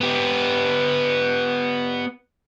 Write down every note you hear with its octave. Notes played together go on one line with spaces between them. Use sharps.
B3 G4